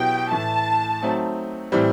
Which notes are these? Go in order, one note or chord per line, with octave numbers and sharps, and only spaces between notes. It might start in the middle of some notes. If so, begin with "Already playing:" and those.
Already playing: B2 F#3 B3 E4 G4 G5
A2 E3 A3 A5
F#3 A3 C4 D#4
A2 E3 G3 C4